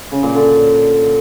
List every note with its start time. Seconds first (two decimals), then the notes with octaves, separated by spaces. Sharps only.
0.12 C#3
0.23 A#2
0.35 D3